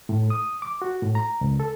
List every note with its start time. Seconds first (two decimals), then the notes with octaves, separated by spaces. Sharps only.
0.09 A2
0.30 D#6
0.62 D6
0.82 F#4
1.02 A2
1.15 A#5
1.41 C#2
1.60 A4